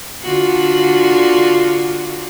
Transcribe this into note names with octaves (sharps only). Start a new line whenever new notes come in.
D3 F4 F#4